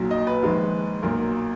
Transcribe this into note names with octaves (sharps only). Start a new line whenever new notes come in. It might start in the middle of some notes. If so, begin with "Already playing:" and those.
Already playing: B1 A#2 F#3
D#5
B4
A#1 G#2 D#3 G#3
B1 A#2 F#3 A#4